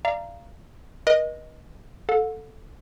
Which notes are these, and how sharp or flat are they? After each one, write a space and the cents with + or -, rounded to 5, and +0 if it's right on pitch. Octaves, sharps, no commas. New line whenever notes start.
D5 +20 F5 -20 A#5 +0
B4 -40 D#5 +0
A4 +0 F#5 -40